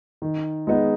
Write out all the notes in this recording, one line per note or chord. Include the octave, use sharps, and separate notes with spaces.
D#3
G#3 B3 D#4 G#4